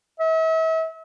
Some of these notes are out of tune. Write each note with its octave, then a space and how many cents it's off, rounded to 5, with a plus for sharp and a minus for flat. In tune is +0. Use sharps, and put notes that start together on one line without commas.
E5 -40